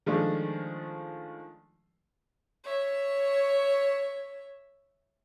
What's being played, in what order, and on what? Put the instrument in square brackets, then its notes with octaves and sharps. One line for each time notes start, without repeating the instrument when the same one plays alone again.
[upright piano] D#3 F3 G#3 A3 D4
[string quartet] C#5 E5